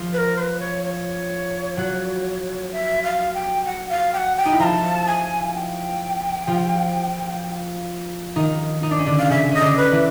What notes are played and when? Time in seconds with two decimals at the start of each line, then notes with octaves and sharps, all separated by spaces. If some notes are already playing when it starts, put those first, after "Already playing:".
Already playing: F3 F4
0.13 B4
0.18 A#4
0.36 C5
0.40 B4
0.60 C#5
0.83 C#5
1.77 F#3 F#4
2.72 E5
3.03 F5
3.34 G5
3.65 F#5
3.89 F5
4.13 G5
4.17 F#5
4.36 G5
4.46 D#4
4.52 E4
4.59 F3 F4 A5 A#5
5.07 G#5
5.54 G5
6.47 F3 F4
8.36 D#3 D#4
8.83 D#4
8.91 D4
8.99 C#4
9.06 D3 D4
9.19 F5
9.30 C#3 C#4 E5
9.51 C#4 D#5
9.61 D3 D4
9.77 B4
9.92 E3 E4